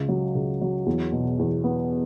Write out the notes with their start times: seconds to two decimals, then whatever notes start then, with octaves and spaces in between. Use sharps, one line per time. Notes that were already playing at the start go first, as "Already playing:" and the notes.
Already playing: C#2
0.09 F#3
0.35 C#2
0.61 F#3
0.86 E2
1.12 B2
1.39 E2
1.64 B3